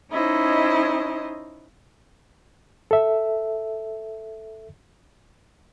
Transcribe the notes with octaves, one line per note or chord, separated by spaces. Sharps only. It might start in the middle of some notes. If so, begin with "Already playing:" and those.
C#4 D#4 E4 C5 D#5
A4 E5